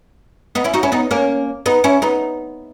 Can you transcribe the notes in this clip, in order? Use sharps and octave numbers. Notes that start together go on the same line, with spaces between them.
B3 D#4
C#4 E4
D#4 F#4
C#4 E4
B3 D#4
A#3 C#4
B3 D#4
C#4 E4
B3 D#4